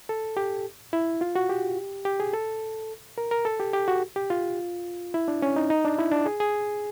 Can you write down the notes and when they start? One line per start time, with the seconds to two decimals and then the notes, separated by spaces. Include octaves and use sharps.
0.09 A4
0.37 G4
0.93 E4
1.21 F4
1.36 F#4
1.49 G4
2.05 G4
2.20 G#4
2.33 A4
3.18 A#4
3.31 A#4
3.45 A4
3.60 G4
3.73 G4
3.88 F#4
4.16 G4
4.30 F4
5.14 E4
5.28 D4
5.42 C#4
5.56 D#4
5.70 D#4
5.85 D4
5.99 E4
6.12 D4
6.26 G#4
6.40 G#4